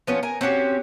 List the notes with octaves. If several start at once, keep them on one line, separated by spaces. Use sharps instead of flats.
F3 B3 C#4 F4
A#4 G#5
C4 C#4 F#4 G4